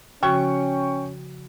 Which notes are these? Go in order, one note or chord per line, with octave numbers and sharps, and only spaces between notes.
C#3 F3 C#4 F#4 G5 C#6